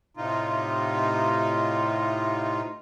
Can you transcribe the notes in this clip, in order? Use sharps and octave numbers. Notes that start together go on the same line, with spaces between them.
A2 C3 D#4 F4